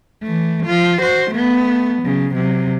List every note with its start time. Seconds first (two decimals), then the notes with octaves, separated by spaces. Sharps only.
0.23 E3 A3
0.66 F3 F4
1.02 F#4 C5
1.31 A3 B3
2.03 C#3 F#3
2.34 C3 F#3